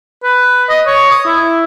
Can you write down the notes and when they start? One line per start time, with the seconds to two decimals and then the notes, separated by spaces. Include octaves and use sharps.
0.23 B4
0.69 D#5
0.86 C#5
1.11 D#6
1.25 E4